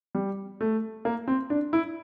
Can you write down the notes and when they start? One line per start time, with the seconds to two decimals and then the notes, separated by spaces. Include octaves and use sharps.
0.15 G3
0.61 A3
1.05 A#3
1.28 C4
1.50 D4
1.73 E4